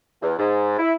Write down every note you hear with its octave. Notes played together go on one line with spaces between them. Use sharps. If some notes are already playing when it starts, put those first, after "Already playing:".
E2
G#2
E4